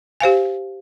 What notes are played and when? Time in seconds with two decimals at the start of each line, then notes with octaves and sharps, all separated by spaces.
0.20 G4 C5 F5 G#5